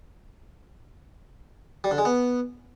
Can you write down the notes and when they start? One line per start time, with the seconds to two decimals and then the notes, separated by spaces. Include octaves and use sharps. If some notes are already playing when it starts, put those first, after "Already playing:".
1.84 G3
1.91 D3
1.98 G#3
2.05 B3